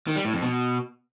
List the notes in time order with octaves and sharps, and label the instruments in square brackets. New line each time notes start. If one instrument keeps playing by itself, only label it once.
[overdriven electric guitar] D#3
G3
A2
F2
B2